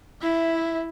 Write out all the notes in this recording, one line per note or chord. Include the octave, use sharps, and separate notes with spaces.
E4 E5